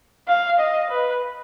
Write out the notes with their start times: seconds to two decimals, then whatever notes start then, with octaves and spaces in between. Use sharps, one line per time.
0.28 F5
0.60 D#5
0.91 B4